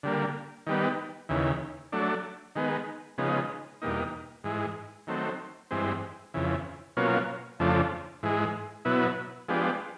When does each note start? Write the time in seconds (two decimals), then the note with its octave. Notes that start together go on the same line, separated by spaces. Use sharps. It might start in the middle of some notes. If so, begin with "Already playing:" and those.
0.03 D3 G3 A#3
0.66 D#3 G3 B3
1.29 D#2 C#3 E3
1.92 F#3 A3 D4
2.55 D#3 G#3 B3
3.18 C#3 F3 G#3 B3 D#4
3.82 E2 B2 G3 A#3 D#4
4.44 G#2 E3 G#3
5.07 D#3 F#3 A3 C4
5.71 G2 E3 G#3 C4
6.34 F2 C#3 E3
6.97 B2 F#3 A#3 C#4 F4
7.59 F2 C#3 F3 A3 D4
8.23 G#2 E3 G#3
8.85 B2 F#3 B3 E4
9.48 F3 G#3 B3 D4 G4